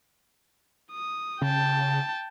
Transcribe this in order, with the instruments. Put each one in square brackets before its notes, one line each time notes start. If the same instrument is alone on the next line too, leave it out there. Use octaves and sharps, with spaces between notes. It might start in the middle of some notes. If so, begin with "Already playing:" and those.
[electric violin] D#6
[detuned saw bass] C#3 [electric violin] G5 A5